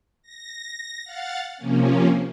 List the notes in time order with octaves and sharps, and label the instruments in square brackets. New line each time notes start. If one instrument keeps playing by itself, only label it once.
[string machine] A#6
F5 F#5 A6
C3 F3 A#3 C#4